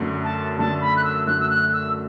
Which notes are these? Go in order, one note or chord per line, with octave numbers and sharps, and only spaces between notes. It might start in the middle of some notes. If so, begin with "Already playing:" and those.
Already playing: F#2 D3 A3
A5
F#2 D3 A3 A5
B5
F#6
E6
F#2 D3 A3 F#6
E6
F#6
E6